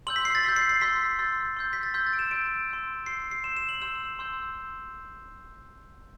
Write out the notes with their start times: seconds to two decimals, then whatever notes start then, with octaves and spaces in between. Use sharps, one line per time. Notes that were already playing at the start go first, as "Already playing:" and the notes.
0.07 C6 E6 G6 F#7
0.16 B6
0.25 C7
0.35 A6
0.44 C6 E6 G6 B6
0.56 C7
0.69 C7
0.81 C6 E6 G6 B6
1.19 C6 E6 G6 A6
1.57 C6 E6 G6
1.73 B6
1.83 A6
1.94 C6 E6 G6
2.07 A6
2.13 D7
2.19 E7
2.31 C6 E6 G6 D7
2.69 C6 E6 G6
3.06 C6 E6 G6 C7
3.31 C7
3.44 C6 E6 G6 E7
3.57 E7
3.69 F#7
3.82 C6 E6 G6 E7
4.19 C6 E6 G6